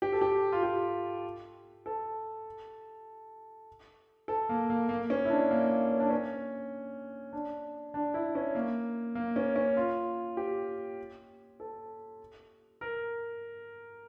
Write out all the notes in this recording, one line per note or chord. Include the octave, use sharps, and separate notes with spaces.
G4
A4
G4
F4
G4
A4
A4
A#3
A#3
A#3
C#4
E4
D4
A#3
A#3
C#4
D4
C#4
D4
D4
E4
C#4
A#3
A#3
C#4
C#4
F4
G4
A4
A#4